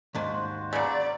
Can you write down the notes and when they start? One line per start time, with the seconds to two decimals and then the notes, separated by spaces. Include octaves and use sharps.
0.15 D#2 G#2 F#4 C5 A5
0.73 C#3 F#3 D5